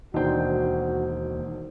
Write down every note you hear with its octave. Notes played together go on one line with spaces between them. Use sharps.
E1 D#2 D4 D#4 F#4 C5 G5